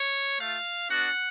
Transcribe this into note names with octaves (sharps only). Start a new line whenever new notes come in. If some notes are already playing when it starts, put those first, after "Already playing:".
Already playing: C#5
A3 F4 F5
B3 D4 F#4 F#5